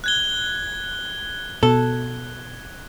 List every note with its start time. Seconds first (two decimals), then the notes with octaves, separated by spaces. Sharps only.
0.04 F#6 G#6 G7
1.63 B2 A4